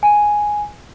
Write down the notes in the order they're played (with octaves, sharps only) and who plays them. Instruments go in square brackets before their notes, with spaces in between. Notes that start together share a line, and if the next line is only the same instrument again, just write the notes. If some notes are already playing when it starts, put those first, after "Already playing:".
[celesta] G#5